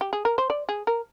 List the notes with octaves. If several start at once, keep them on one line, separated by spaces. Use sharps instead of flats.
G4
G#4
A#4
C5
D5
G#4
A#4